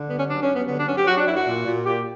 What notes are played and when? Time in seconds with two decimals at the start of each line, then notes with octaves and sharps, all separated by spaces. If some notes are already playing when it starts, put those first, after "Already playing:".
Already playing: D3
0.09 G2 B3
0.18 C#4
0.29 F#3 D4
0.42 C#4
0.48 G2
0.55 B3
0.67 D3 B3
0.78 D4
0.87 F#3 C#4
0.97 G4
1.07 F#3 F#4
1.17 D4
1.26 F#2 E4
1.36 F#4
1.46 A#2
1.65 A#2
1.85 A#2 G4